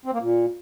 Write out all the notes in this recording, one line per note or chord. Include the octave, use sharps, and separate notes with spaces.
C4
A#3
A#2